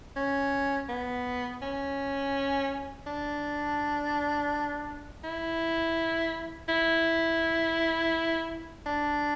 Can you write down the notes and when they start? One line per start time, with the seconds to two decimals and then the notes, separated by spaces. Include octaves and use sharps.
0.16 C#4
0.89 B3
1.62 C#4
3.06 D4
5.24 E4
6.68 E4
8.86 D4